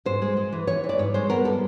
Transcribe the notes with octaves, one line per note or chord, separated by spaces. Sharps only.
G#2 C5
G#3
G#3
E3
E3 C#5
E3
D5
G#2 C#5
G#3 C5
B3 A#4
G3 A4